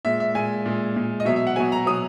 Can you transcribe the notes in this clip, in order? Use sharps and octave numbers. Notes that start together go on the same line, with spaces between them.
A#2 G#3 E5
E5
A#2 G#3 G#5
A#2 G#3
A#2 G#3
D#5
B2 F#3 E5
E5
F#5
B2 F#3 G#5
A#5
B2 F#3 D#6